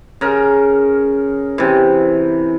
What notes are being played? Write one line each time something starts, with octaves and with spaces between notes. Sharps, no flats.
C#3 A#4
C3 E3